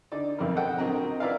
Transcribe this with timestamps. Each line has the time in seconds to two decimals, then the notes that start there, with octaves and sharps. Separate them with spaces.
0.12 D3 D#4 D5
0.39 B1 F2 C4 A#4
0.56 A4 D#5 F#5 G5
0.78 A#2 D3 F#3 C4 D#5 A#5
1.20 E4 A#4 B4 D5 D#5 F5